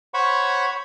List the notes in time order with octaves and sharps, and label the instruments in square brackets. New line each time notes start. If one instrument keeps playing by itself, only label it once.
[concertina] C5 C#5 F#5 B5 C#6